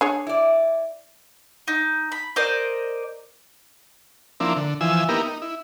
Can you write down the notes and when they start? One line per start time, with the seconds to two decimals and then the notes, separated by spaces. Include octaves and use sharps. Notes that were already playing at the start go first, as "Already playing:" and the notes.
0.01 D4 G#4 C#5
0.27 E4 D5
1.68 D#4
2.12 B5
2.36 A#4 C5 D5 D#5
4.40 F3 A#3 C4 D4 E4
4.56 D3
4.81 E3 F3 G#5 E6
5.09 A#3 B3 D#4 E4 G4 A#4
5.22 D#4
5.42 E4